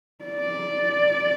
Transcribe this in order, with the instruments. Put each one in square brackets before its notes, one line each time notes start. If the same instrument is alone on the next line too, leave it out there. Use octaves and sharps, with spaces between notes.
[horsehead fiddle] D5